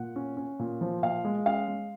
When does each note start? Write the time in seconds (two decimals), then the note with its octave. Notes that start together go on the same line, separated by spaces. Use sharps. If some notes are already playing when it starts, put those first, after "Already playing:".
Already playing: A#2 F#5
0.16 C#4
0.37 C#4
0.59 A#2
0.81 F3
1.03 A#2 F5
1.25 G#3
1.46 C#4 F5
1.68 G#3